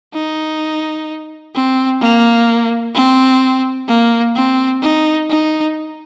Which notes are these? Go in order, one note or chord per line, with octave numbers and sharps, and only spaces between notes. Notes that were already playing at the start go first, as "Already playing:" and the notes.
D#4
C4
A#3
C4
A#3
C4
D#4
D#4